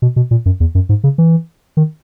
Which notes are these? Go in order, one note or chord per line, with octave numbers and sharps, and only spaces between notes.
B2
B2
A#2
F#2
E2
F#2
G#2
C#3
E3
D#3